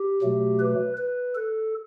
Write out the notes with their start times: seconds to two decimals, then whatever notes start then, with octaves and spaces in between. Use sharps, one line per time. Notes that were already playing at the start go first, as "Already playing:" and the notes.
Already playing: G4
0.22 B2 F#3 A3
0.59 B4
0.97 B4
1.35 A4